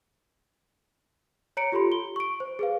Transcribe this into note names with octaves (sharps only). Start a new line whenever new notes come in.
C#5 A#5 C#7 D7
F4 G4 A4 B5 C6
G7
C#6 D7
C5
G#4 B4 F5